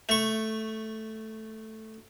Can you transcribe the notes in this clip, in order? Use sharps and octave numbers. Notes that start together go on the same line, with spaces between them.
A3 C#6